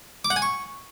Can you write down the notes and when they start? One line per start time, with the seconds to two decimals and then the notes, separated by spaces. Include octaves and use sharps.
0.25 D6
0.30 F#5
0.36 G#5
0.42 C#6